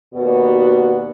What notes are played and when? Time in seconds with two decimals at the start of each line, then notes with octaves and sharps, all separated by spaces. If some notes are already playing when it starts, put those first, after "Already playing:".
0.13 D#2 B2 B3 F#4 D5